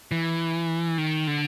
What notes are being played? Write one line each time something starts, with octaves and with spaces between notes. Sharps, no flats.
E3
D#3
D3